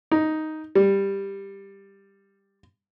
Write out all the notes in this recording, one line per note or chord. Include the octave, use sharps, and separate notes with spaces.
D#4
G3